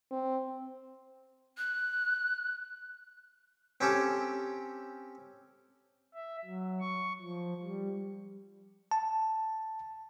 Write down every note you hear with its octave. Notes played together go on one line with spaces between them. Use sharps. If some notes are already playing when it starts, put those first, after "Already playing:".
C4
F#6
C4 C#4 G4 A4
E5
F#3
C#6
F3
G3
A5